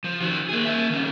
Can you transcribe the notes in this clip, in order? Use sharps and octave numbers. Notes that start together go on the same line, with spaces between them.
F3
D#3 F#4
A#3 G#4
A#3 E5
D#3 C#4